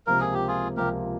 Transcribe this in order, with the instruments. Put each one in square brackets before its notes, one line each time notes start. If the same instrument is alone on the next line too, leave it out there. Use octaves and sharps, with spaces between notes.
[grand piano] C#2 C3 F3 A#3 [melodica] A#4
[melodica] G#4
G4
F4 G#4
[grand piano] C#2 C3 F3 A#3 [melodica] G4 A#4